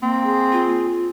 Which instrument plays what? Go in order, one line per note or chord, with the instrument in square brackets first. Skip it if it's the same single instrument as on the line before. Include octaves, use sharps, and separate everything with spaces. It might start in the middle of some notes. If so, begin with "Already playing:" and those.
[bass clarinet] A#3 [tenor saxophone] C4
[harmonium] G#4
[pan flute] F4